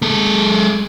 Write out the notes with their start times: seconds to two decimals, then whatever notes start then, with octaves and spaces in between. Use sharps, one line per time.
0.02 G#3 A4